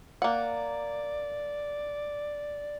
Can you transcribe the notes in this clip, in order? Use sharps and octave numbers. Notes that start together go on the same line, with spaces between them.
A#3 D5 F#5